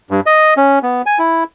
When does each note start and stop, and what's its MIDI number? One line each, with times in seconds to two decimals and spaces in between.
0.11 0.20 43
0.26 0.54 75
0.57 0.79 61
0.83 1.02 59
1.06 1.19 80
1.19 1.44 64